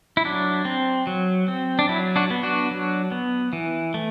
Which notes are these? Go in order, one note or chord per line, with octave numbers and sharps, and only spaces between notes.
E4
F#3 D4
C4
F#3
C4
D4
F#3 E4
D4 F#4
B3
D4 F#4
F#3
B3
E3
A3